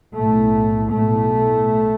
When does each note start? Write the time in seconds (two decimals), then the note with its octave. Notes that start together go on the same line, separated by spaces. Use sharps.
0.15 B1 A2 A3
0.91 B1 A2 A3